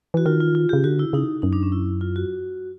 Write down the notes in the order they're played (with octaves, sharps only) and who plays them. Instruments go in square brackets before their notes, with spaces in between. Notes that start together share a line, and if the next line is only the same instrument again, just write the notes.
[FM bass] E3 [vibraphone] F#4
[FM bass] D#3 [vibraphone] F4
[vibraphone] F4
F4
[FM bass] C#3 [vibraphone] G4
[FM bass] D3 [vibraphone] F#4
[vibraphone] E4
[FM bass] C#3 [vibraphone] D#4
[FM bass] F#2 [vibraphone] D#4
[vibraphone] D4
C#4
E4
F4
F#4